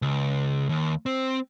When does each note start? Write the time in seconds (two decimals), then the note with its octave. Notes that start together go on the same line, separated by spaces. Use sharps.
0.02 C#2
0.69 D#2
1.06 C4